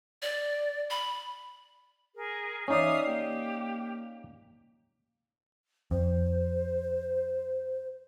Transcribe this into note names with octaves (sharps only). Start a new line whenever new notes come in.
D5
B5
G#4 A#4
E3 C#4 D#4 D5 E5 F5 D#6
A#3 G4
F2 C5